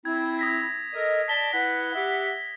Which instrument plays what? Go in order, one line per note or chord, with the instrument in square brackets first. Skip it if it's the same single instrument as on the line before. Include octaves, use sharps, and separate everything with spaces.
[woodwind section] C4 E4 [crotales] G#6
[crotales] D#6 A#6 B6
[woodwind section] A4 A#4 D#5
[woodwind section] D5 A5 [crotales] B6 G7
[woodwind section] E4 B4 F#5 [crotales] B6
[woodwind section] G4 E5 F#5